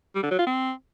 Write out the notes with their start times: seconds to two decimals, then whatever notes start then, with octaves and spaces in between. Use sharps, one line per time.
0.15 G3
0.23 D3
0.31 F#3
0.39 F4
0.46 C4